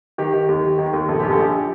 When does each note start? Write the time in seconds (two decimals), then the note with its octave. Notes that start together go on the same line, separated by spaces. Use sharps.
0.18 D#3 G4
0.34 D#3
0.49 D#2
0.64 D#3
0.79 D#3
0.93 D#2
1.09 A#1 A4
1.20 A#1 G4
1.31 A4
1.39 A#1 G4